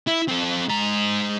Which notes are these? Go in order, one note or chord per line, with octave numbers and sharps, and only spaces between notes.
E4
C4 A4
G#2 A#5